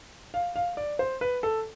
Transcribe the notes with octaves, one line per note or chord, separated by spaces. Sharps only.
F5
F5
D5
C5
B4
A4